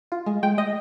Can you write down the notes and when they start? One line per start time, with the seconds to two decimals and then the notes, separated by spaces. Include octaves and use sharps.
0.12 F4
0.26 G#3
0.43 G#3 G5
0.58 G#3 D#5